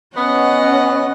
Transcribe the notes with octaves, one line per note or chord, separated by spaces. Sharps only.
B3 C#4 D#5 F#5